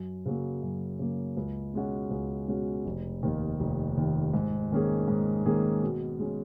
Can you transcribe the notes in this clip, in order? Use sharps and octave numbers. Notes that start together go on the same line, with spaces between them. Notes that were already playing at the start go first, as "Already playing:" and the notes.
Already playing: F#2
C#3 F#3 A#3
F#2
C#3 F#3 A#3
C#2
B2 G#3 C#4 F#4
C#2
B2 G#3 C#4 F#4
F1
D#2 D#3
F1
D#2 D#3
G#2
D#3 A#3 C#4 G#4
G#2
D#3 A#3 C#4 G#4
B2
G#3 C#4